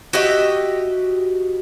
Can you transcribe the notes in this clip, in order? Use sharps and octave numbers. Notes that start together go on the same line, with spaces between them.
F#4 G4 D#5 E5